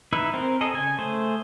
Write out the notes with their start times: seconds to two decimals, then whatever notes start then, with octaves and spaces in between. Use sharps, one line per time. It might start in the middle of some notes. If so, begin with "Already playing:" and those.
0.13 D#4 E4 B4 E5
0.34 C4 A#4
0.61 G#4 A4 D#5
0.74 C#3 G#5
0.99 A3 G#4 C5